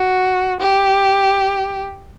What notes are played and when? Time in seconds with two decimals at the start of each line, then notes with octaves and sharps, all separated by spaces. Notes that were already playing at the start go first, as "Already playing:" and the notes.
Already playing: F#4
0.60 G4